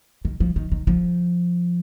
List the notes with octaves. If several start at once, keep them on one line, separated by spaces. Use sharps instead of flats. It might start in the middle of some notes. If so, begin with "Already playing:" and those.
D#3
F3
D#3
D#3
F3